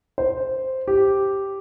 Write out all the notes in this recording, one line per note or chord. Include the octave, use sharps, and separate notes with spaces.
C5
G4